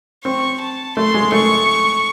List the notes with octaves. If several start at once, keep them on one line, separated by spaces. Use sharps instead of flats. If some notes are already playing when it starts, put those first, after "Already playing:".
C4 C#6
A5
A3 C6
G#3
A3 C#6